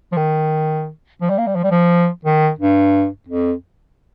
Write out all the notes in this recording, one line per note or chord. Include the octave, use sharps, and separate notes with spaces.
F3
D#3
F3
G3
A#3
G3
F3
G3
F3
D#3
G2
F2